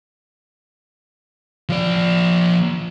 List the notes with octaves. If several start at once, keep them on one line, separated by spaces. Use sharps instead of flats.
F3 D5